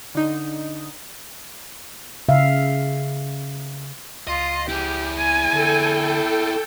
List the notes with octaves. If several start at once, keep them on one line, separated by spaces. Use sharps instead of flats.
D3 D#4
C#3 E5 F5
C#2 F4 D#5
E4 G4 G#4
G#5
D3 A4 G5